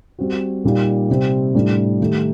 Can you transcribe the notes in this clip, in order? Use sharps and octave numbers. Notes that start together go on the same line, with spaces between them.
G3 C4 F#4
A#2 G3 A#3 D#4
C3 G3 C4
A2 G3 D4
D#3 A3 D#4 G4